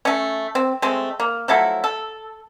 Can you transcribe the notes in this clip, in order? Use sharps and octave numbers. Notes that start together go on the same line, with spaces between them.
A3 C#4
C4
G#3 A3 C4
A#3
F3 F#3 A3 E4
A4